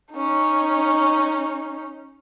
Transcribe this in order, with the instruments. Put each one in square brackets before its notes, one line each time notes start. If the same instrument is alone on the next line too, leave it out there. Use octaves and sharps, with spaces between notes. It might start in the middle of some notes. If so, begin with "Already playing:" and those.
[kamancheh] C#4 D#4